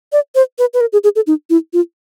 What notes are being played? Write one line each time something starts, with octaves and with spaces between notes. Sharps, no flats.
D5
C5
B4
B4
A#4
G#4
G#4
A4
D#4
E4
F4